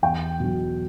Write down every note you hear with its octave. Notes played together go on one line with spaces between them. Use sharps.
E2 G5
B2 F#3